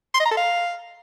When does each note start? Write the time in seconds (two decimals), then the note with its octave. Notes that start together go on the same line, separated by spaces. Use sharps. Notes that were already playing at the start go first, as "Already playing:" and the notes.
0.14 C6
0.20 D#5
0.25 A#5
0.31 A4
0.37 F5